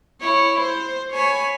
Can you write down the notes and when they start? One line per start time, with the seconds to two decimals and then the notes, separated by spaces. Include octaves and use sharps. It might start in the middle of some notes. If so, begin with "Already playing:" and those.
0.20 E4 C#5
0.61 C5
1.12 C#5 G#5 B5